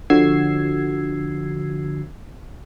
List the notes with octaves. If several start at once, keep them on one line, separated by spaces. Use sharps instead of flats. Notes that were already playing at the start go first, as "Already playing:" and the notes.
D3 F3 F#4 E6 G#6 C7